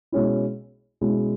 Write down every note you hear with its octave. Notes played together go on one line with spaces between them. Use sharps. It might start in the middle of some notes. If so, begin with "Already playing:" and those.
B2 G#3 C#4 E4
B2 G#3 C#4 E4